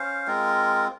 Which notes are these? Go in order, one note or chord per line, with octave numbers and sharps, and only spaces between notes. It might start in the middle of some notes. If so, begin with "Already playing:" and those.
Already playing: C#4 C5 F5
G#3 C4 F4 A#4